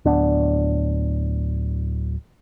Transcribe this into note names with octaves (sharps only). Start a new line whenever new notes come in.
D1 B3 D4